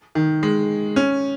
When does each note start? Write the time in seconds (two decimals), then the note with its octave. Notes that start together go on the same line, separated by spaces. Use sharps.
0.15 D#3
0.43 G#3
0.96 C#4